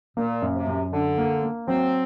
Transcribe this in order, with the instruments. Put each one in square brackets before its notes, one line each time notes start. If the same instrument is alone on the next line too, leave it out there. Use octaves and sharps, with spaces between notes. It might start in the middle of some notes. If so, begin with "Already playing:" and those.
[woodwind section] A#2 [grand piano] A#3
[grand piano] F#2
[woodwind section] C3
[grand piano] F#2
[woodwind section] D3 [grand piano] D4
[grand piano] A#3
A#3
[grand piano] F#3 [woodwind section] C4